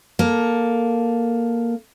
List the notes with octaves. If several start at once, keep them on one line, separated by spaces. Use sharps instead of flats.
A#3 A4